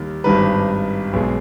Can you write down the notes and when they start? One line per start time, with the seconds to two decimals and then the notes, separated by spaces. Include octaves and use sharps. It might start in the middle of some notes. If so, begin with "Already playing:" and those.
Already playing: D#2 D#3 G3
0.24 G#1 G2 D#3 G3 B4
1.13 B1 B2 G#3